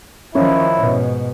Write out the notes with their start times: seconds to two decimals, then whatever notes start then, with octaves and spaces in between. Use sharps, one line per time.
0.35 D#3 F3 C#4 E4
0.78 G#2 B2